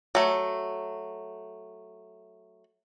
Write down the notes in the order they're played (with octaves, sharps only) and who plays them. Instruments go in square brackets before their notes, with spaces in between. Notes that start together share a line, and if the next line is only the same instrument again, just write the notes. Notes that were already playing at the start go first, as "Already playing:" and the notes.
[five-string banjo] F#3 A3